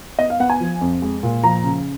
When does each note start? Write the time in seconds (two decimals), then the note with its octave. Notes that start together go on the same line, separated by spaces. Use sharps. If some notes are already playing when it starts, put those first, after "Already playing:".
0.19 B3 D#5
0.30 F5
0.40 B3 F#5
0.50 G#5
0.60 F3
0.81 F2
1.02 G#3
1.23 A#2
1.44 F3 A#5
1.64 C#3